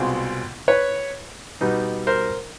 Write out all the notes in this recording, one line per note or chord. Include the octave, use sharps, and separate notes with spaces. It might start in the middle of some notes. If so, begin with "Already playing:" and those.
Already playing: C2 B2 G#3 C4 F4
B4 C#5
B2 G3 B3 D#4
A#4 C5